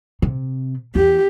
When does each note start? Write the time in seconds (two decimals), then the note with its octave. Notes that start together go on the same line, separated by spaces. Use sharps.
0.22 C3
0.95 E2 G4